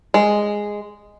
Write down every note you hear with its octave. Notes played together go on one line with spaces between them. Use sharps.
G#3